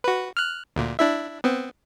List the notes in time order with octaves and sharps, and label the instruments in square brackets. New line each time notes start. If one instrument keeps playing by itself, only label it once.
[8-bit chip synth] F#4 B4
F6 F#6
D2 A#2
D4 E4 E5
B3 C4